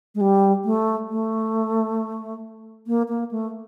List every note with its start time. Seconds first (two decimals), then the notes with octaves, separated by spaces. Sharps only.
0.15 G#3
0.21 G3
0.65 A3
1.10 A3
2.87 A#3
3.09 A#3
3.31 A3